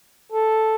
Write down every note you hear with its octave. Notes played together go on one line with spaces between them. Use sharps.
A4